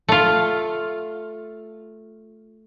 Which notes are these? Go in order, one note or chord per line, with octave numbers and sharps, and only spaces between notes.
A3 F4